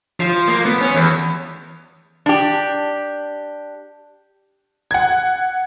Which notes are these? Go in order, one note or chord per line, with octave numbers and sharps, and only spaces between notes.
F3
A#3
B3
C#4
E2
D4 G4
F#5 G#6